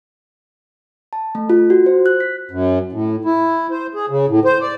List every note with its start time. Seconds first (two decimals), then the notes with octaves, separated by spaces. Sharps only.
1.13 A5
1.35 A3
1.50 F4
1.70 F#4
1.86 C5
2.06 F#6
2.20 B6
2.51 F#2
2.92 A2
3.25 E4
3.71 C5
3.94 G#4
4.09 C#3
4.29 A2
4.45 C5
4.61 D5